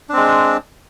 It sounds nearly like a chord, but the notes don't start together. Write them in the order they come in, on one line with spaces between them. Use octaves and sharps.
D4 C4 G#3